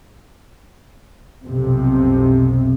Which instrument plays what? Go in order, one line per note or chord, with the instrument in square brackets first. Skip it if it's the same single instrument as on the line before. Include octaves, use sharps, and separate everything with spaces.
[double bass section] B1 F2 C3